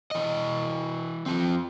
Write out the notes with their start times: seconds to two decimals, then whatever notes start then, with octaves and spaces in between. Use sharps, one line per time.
0.11 E3 D#5
1.26 F3 C4